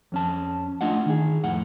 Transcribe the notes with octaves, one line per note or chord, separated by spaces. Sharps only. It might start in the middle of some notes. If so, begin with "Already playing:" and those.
F2 C#4 A5
A3 D4 F4 D#5 F#5
D#3 G#4
F2 A2 F#5